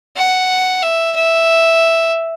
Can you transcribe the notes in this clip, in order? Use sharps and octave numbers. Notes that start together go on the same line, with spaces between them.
F#5
E5
E5